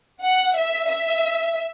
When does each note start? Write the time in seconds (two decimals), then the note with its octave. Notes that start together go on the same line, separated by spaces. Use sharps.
0.23 F#5
0.56 E5
0.89 E5